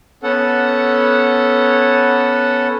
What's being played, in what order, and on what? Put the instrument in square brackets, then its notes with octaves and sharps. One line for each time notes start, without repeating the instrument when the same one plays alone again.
[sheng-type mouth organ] B3 C#4 A4 F#5